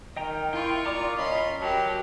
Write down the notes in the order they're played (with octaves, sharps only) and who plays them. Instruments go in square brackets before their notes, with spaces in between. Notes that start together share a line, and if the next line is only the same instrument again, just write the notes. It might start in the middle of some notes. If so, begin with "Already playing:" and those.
[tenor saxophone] D#3 [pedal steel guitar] D#5 G5 A#5
[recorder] E4 [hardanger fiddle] F4 C#6 [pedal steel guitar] G5 C6
[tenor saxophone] A#2 [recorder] D5 [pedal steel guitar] A#5 D6 D#6
[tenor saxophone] C#4 [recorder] D#5 [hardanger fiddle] B5 C6
[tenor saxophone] F#3 [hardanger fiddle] G4 A#4 [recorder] A5